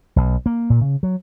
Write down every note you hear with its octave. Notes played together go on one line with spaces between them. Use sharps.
B1
A#3
A#2
C#3
F#3